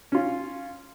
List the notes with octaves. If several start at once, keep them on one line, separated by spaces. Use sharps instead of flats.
C#4 F4